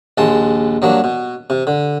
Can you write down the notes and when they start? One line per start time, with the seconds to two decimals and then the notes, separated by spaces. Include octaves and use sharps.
0.18 A#1 D#2 G#3 A5 C6
0.82 G2 F#3 A#3 D4
1.04 B2
1.50 C3
1.67 D3